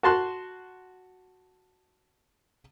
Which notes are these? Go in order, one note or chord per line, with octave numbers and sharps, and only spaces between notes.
F#4 A5 C6 F#6